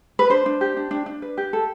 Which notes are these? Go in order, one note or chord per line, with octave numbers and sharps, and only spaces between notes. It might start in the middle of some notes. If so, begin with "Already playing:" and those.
B4
D4 C5
D4
G4
D4
D4
D4
B4
G4
A4